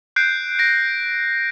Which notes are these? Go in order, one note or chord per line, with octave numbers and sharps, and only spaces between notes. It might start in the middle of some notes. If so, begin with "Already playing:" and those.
F#6 G6 C7 D7
A#6 D7